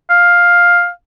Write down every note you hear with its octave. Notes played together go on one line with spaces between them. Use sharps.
F5